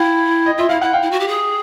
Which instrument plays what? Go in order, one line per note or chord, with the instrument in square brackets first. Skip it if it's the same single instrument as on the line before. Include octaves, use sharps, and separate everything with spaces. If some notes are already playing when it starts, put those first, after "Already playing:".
Already playing: [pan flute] E4 [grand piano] F5 G5
[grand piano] D#5
[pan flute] F4 [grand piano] E5
[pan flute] E4 [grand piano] F5
[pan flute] E4 [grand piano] F#5
[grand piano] F5 G5
[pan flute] E4
F#4
G4
G#4